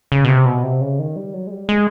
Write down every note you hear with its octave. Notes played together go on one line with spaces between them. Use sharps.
C#3
B2
C3
B2
C3
C#3
D#3
G3
F#3
G#3
G3
G#3